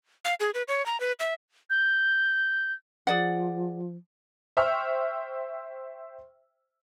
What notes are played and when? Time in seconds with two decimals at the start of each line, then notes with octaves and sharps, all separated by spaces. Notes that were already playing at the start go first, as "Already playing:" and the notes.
0.25 F5
0.40 G#4
0.54 B4
0.68 C#5
0.86 A#5
1.00 B4
1.20 E5
1.70 G6
3.07 F3 G#4 D5 F#5
4.57 C5 E5 G5 C#6 E6 F6